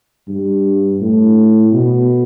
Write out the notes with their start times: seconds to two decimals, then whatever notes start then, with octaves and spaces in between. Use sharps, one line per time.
0.28 G2
1.01 A2
1.72 B2